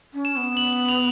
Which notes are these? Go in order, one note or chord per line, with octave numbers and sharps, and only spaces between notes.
C#4
E7
B3
F#7
F#7
F7